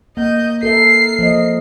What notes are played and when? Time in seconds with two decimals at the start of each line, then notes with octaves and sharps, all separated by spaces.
0.17 A#3 D#5 G6
0.63 A4 A#4 E5 C7
1.19 F3 A#3 D#5